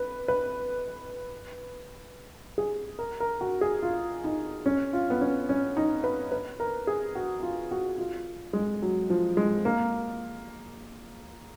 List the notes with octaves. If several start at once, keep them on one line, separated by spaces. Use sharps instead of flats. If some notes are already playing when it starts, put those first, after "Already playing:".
Already playing: B4
B4
G#4
A#4
A#4
F#4
G#4
F4
D#4
C#4
F4
B3
C#4
C#4
D#4
B4
B4
A#4
G#4
F#4
F4
F#4
F4
G#3
F#3
F3
G#3
A#3